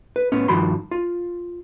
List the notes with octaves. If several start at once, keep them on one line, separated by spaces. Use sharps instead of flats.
B4
A2 B3 C#4
G2 D#3 F3 F#4 B5 C6
F4